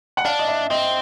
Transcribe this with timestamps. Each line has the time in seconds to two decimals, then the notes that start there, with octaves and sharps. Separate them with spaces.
0.17 F#5
0.25 D4 F5
0.39 D#5
0.48 E5
0.70 C4 D#5